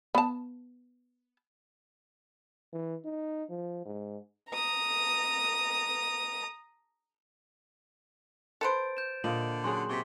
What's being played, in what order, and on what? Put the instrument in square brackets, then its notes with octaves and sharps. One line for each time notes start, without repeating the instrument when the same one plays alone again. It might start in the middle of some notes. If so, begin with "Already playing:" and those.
[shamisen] B3 A5
[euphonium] E3
D#4
F3
G#2
[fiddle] A#5 D#6
[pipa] A4 B4 C5 [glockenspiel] A6 D7
[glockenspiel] G6 E7
[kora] A#2 F4 D#5 [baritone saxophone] D3 [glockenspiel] F#7
[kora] F#3 C#4 G#4 [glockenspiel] C6
[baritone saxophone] C3 [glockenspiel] C#6 B6